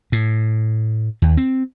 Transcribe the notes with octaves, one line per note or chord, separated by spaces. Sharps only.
A2
D#2
C4